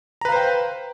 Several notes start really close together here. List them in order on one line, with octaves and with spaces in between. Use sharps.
A#5 B4 F5 C5 G5